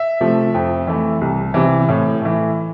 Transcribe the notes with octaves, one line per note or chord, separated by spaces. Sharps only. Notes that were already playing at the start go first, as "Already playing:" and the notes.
Already playing: E5
C3 F3 A3
F2
E3 A3
C2
C3 E3
A2
E3 A3